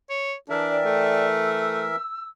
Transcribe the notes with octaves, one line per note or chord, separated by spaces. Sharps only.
C#5
E3 D4 A#4 E5 A5
D5 G5
A3
E6